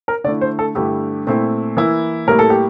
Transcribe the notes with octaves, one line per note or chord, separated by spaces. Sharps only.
A#4
D3 A3 E4 D5
C5
A4
G2 D3 A3 E4 G4
A#2 A3 C4 E4
E3 A#3 E4
A2 G3 A#3 E4 A#4
A4
G4